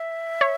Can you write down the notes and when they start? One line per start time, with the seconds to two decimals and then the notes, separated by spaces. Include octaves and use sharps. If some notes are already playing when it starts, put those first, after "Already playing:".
Already playing: E5
0.41 C#5